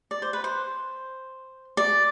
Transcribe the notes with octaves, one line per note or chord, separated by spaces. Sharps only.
D5
C5
B4
C5
D5